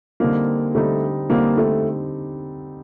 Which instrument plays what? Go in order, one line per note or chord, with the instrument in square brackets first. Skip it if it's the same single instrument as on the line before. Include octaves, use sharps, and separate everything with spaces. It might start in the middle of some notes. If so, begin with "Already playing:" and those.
[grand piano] D3 G3 C4 D#4 [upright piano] A#3
[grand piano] D3 G3 C4 D#4 [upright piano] A3
[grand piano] D3 G3 C4 D#4 [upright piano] A#3
[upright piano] A3